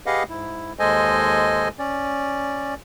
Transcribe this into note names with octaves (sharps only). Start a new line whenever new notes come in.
G4 G#4 B4 D#5 F5 F#5
G#2 E4
D#2 G#3 A4 C5 D#5 G#5
C#4 D5